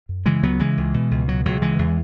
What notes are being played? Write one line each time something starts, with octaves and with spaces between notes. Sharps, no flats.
F#2
C#3 E3 G#3
C#2 F#3 B3
C#3 E3 G#3
C#2
B2
C#2
B2 F#3
C#2 F#3
C#3 E3 G#3
E2